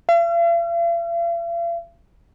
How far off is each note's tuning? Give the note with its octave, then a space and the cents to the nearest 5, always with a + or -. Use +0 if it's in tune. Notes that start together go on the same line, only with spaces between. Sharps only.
F5 -45